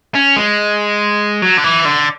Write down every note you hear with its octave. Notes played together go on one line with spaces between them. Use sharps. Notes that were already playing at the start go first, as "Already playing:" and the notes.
C#4
G#3
F#3
D3
E3
D3